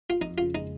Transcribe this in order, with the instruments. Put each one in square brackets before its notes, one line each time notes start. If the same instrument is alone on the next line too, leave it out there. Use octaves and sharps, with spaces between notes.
[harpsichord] F4
[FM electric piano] F2 [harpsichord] D#4
[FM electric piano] C#3 [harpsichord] F4
[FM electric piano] G#3 [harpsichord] D#4